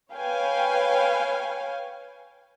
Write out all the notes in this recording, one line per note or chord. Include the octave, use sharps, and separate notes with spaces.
B4 C#5 F5 G5 G#5